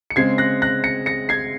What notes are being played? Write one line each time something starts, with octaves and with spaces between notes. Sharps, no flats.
C#7
C#3 G#3 C4 G#6 C7
F#6 A#6
F#6 A#6
A#6 C#7
A#6 C#7
G#6 C7